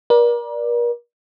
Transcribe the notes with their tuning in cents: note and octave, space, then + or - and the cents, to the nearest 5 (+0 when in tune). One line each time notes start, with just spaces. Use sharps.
A#4 +40 D5 +5